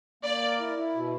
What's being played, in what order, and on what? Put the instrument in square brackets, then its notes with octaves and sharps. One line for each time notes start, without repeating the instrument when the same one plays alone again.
[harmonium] A#3 [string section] D5
[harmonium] A#4
E4
E4
B2